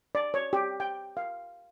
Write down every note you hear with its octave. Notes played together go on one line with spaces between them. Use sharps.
D5
C#5
G4
G5
F5